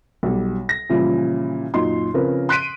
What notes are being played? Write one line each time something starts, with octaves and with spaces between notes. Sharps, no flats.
B1 G3
A#6
A#2 C#3 E3 F3 G3 E4
F#2 A#2 D#4 C6
C#3 F3 C4 A#4 B4
C6 F#6 B6 D7 D#7